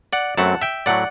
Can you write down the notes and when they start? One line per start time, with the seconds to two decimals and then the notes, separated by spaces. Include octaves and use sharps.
0.13 D5 F#5
0.37 F#2 F#3 A3 C4 F#5 A5
0.61 E5 G5
0.86 A2 F#3 A3 D5 F#5